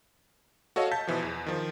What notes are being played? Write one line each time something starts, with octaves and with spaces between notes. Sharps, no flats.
F#4 A4 C#5 D#5 F5
A5 G6 B6
B2 E3 F3
E2
D#3 F3